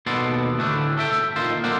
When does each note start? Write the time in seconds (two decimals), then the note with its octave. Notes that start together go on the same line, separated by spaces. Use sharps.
0.06 D#2 B2 B3 A4 D5 C6
0.58 D2 A2 E3 A3 C#4 D4
0.97 A4 E5 G5
1.36 A#2 D#3 F4 A4 C5
1.64 A#3 A4 A#4 C5 D5 F#5